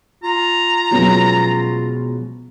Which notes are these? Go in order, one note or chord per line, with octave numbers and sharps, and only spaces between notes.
F4 A#5
B2 F3 F#3 G#3 B3 C#4